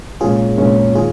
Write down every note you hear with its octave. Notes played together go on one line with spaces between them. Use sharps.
A#2 G#3 C#4 F4 G#4
A#2 G#3 C#4
D#3 F4 G#4